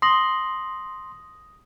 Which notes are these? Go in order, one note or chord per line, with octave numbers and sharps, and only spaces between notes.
C6 D#6 A#6 F#7